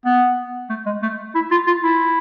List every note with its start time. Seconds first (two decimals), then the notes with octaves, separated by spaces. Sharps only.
0.05 B3
0.70 A3
0.86 G#3
1.03 A3
1.35 E4
1.51 F4
1.67 F4
1.84 E4